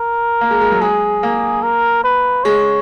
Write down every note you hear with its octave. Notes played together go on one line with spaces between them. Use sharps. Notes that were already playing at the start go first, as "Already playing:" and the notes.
Already playing: A#4
A#3
G#3
G#3
F#3
G#3 G#4
A#3
A#4
B4
G#3 C#5